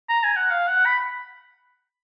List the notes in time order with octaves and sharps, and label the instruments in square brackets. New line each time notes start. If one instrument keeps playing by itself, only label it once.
[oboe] A#5
G#5
F#5
F5
F#5
B5